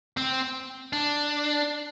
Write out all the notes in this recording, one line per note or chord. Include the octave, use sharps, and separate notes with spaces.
C4
D4